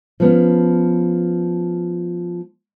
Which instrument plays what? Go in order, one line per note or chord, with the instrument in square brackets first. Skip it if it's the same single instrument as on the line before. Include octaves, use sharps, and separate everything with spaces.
[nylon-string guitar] F3 B3 C#4